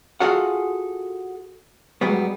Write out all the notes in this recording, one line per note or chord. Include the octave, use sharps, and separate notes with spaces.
F4 F#4 G#4 A4 F5 F#5
G#2 F#3 G3 B3